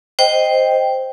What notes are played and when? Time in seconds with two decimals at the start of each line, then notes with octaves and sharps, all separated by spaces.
0.19 C5 D#5 G5